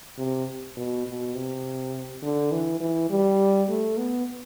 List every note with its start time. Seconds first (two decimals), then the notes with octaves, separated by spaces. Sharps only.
0.18 C3
0.77 B2
1.06 B2
1.35 C3
2.22 D3
2.51 E3
2.80 E3
3.10 G3
3.68 A3
3.97 B3